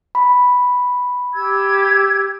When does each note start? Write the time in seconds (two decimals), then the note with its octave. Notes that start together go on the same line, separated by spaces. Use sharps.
0.15 B5
1.34 G4 E6 G#6